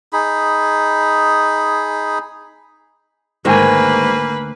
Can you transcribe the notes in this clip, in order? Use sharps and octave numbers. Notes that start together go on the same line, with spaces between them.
D#4 G#4 B5
D2 G#2 D#3 A#3 B4 G5 G#5